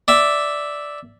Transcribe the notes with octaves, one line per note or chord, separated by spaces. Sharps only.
D5 E5